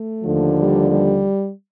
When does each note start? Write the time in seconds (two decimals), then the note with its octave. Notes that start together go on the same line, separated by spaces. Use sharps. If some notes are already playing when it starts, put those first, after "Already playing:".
Already playing: A3
0.23 D#2 D3 F3
0.56 G3
0.90 G3